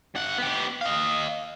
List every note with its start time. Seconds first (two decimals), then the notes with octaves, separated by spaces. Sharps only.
0.15 G2 F#5
0.38 B3 G4
0.81 D#5 F5